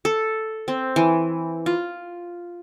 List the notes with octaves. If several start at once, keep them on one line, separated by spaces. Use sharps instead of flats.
A4
C4
E3
F4